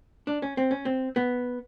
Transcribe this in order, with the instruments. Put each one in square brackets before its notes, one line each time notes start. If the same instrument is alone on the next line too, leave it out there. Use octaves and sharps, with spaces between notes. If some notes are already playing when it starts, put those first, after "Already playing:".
[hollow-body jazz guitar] D4
C#4
C4
C#4
C4
B3